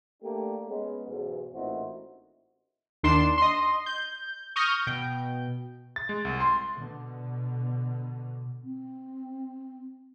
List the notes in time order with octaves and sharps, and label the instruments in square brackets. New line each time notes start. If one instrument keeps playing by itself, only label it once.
[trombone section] A3 A#3 D4 G4
G#3 B3 C#4
B1 E2 G#2
A1 A#2 C4 D#4 E4 F#4
[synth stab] D#2 D#3 D4 C6 C7 E7
D#5 C6
G6
C#6 D#6 F6 G6 A#6
[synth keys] B2 G5 G6
[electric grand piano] A6
G#3
C2
C6
[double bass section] B2 D3
[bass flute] C4